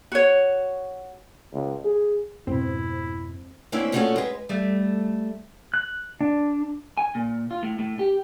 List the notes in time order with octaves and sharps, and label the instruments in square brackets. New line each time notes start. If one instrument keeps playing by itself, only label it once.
[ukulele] F#4 C#5
[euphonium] C#2
G#4
[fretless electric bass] F2 G#2 B2 [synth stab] C4 [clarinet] E4
[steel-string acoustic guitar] D2 A#3 C4 C#4 E4 E5
A#2 F3 A3 C#4 F#4 A4
G#3 B4
[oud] G3 A3
[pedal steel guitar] F#6
D4
[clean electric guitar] G#5
A#2
F4
A2
A2
G4